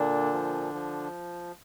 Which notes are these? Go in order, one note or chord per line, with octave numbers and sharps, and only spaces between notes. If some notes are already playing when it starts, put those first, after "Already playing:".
Already playing: A#2 D3 D4
F3
F3